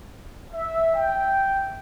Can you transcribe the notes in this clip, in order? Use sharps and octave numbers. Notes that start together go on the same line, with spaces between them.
E5
G5